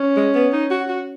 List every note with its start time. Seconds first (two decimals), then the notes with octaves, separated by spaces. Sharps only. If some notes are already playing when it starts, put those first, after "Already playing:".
Already playing: C#4
0.17 G#3
0.35 B3
0.53 D#4
0.71 F#4
0.88 F#4